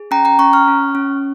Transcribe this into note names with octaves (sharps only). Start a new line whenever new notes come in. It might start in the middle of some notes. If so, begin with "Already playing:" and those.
Already playing: G#4
C#4 G5 A#5
G5 A#5
C#4 A#5 C#6
C#6 F6
C#4
C#4